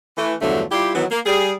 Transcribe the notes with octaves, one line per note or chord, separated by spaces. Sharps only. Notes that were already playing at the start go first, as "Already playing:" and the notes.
E3 A3
E2 G2 D3 F3 F#3 A3
G3 E4 F4 G4
D#3 E3 F#3 B3
A#3
G3 G#4